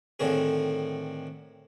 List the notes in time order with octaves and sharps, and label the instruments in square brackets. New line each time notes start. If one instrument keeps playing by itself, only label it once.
[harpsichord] A2 D3 D#3 C4 G#4